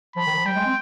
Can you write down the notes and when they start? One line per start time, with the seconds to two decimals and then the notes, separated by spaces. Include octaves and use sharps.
0.16 F3 B5
0.26 D#3
0.36 F3
0.45 G3 G5
0.56 G#3
0.66 C4